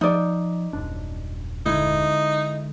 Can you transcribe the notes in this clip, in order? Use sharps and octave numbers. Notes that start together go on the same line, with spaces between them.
F3 D#4 D5
D#1 F#2 D4
D3 G#3 D#4 E4